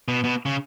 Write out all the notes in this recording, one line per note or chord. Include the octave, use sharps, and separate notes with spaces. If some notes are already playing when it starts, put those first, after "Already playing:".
B2
B2
C#3